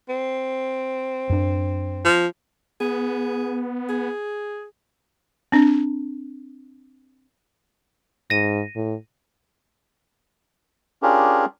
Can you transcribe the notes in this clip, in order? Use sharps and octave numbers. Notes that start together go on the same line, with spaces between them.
C4
F#2 D4
F3
B3 G#4
G#4
C4 D4
G#2 A#6 D#7
A2
C#4 D4 F4 G4 G#4 A#4